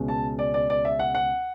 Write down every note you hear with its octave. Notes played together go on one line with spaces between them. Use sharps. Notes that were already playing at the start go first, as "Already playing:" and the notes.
Already playing: C#2 B2 G#3 C#4
A5
D5
D5
D5
E5
F#5
F#5